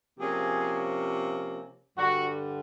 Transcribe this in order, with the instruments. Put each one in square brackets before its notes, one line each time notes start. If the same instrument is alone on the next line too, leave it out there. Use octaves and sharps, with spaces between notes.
[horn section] C3 F3 A#3 C#4 G#4
G2 D3 G3 F#4